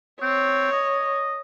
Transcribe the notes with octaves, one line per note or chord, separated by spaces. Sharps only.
C4 C#5
D#5